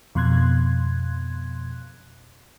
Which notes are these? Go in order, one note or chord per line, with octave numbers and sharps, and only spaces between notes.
F2 B2 C6 F#6 G#6